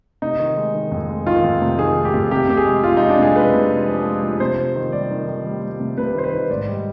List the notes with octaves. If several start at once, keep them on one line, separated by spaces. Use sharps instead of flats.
C3 D#4
D#3
G#3
D#3
F2
G#3
D#3 F4
F2
C3
D#3 G#4
G#3
G4
F2
C3 G4
C3 G4
G#4
G#3
G#3 F4
G#3 D#4
D4
C3 G#4
G#3 B4
C3
G#3
F3
G#3
F3
C3 C5
C3
D#3
G3 D5
D#3
D#3
G3
G3
C3
C3 B4
D#3 C5
B4
D#3
G#2 D5
G3